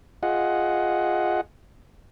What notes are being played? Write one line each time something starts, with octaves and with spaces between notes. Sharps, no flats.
F4 G#4 D#5 F#5